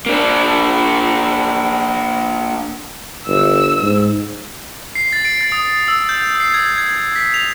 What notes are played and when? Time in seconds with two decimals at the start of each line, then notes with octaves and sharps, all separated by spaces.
0.06 A#3 D4
3.28 G1 E6
3.83 G#2
4.95 C7
5.13 A6
5.25 D7
5.41 A6
5.52 D#6
5.88 E6
6.09 G6
6.40 C7
6.54 G#6
6.78 G#6
7.16 B6
7.34 F7